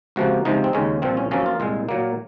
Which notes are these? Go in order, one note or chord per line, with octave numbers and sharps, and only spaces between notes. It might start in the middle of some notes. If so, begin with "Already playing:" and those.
C#2 C3 F3 A#3 F#4
C#2 C3 F3 D#4
C4
D#2 C#3 G#3 C#4
C2 A#2 F3 C4
C#4
F#2 F3 A#3 C#4
F4
C2 A#2 G#3
A#2 F#3 A#3